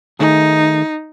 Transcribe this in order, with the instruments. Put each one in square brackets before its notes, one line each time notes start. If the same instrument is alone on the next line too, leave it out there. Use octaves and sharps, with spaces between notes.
[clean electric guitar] D#3 A3 G#4 [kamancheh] D#4